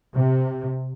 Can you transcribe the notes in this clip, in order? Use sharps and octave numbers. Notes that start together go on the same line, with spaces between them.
C3